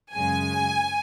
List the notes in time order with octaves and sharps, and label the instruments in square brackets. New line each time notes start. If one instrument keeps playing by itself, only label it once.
[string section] F#2 C#3 G#3 G#5